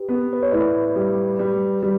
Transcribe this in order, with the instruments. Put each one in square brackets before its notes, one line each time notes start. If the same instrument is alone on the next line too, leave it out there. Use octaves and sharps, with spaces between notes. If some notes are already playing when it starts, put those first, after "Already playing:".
Already playing: [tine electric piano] G4 B4
[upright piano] B3
[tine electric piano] B4
C#5
[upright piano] A2 [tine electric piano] B4 D5
[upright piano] G3
G3
G3